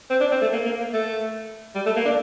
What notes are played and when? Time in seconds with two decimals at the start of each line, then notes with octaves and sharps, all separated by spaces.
0.10 C4
0.20 D4
0.31 C4
0.42 A3
0.52 A#3
0.65 A#3
0.80 A#3
0.93 A3
1.75 G3
1.86 A3
1.96 A#3
2.05 D4